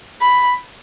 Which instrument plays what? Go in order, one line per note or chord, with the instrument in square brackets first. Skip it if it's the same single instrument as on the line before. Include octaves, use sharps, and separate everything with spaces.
[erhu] B5